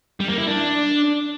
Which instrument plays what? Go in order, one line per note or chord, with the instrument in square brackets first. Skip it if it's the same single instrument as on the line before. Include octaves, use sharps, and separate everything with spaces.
[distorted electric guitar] G3
A#3
E4
D4